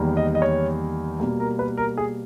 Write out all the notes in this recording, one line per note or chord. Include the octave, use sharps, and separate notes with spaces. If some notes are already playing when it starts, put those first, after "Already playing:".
Already playing: E2 D#3 G3 A#3
D#5
D#5
C#5
B2 G3 A#3
A#4
B4
A#4
G#4